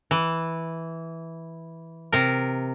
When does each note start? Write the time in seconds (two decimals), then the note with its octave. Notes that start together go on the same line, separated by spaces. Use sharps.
0.11 E3
2.12 C3 A#4